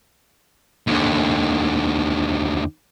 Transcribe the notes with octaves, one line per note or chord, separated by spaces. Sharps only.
D#2 D3